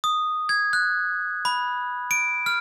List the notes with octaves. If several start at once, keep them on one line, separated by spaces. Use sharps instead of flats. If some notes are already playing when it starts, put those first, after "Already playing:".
D#6
G#6
F#6
B5
D7
F6